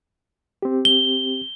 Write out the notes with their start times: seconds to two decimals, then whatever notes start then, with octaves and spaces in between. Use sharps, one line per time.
0.62 C4 G4
0.85 G7